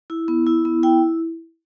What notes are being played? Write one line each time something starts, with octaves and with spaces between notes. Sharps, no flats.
E4
B3
E4
B3
E4 G5